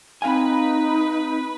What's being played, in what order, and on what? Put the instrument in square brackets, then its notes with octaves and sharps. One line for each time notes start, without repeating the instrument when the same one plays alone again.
[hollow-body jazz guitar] C4 F5 G#5 [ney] D#4 [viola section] B4